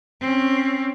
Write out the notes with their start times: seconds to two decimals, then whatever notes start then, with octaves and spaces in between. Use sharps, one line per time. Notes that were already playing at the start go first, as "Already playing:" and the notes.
0.21 C4 C#4